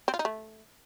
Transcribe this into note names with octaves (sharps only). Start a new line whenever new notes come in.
C4
F4
D#4
A3